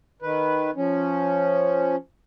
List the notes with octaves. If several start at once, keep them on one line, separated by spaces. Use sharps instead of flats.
D#3 B4
F3 C#4